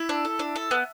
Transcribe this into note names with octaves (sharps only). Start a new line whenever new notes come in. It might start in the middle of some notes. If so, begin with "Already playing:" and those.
Already playing: E4 E5
D4
A4
D4
A4
B3